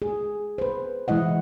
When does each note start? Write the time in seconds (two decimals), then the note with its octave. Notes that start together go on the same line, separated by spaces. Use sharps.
0.02 G#4
0.58 B4 C5
1.08 E3 G#3 E4 D#5 F#5